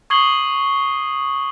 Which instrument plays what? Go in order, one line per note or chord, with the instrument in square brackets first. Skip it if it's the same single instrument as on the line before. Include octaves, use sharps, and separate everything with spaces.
[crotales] C#6 D#6 G#6 C7 F#7 G7